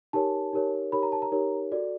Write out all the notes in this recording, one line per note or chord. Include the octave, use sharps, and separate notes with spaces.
D#4 G4 A#4 C#5 A5
D#4 G4 A#4 C#5
D#4 G4 A#4 C#5 B5
A#5
A5
A#5
D#4 G4 A#4 C#5
F#4 A4 D5